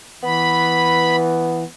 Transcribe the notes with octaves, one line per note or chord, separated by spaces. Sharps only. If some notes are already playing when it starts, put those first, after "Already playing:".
E3 B3 B5